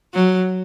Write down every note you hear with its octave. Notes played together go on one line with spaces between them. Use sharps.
F#3